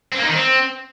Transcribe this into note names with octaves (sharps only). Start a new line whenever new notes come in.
C4
A#3
D#4
D#3
C4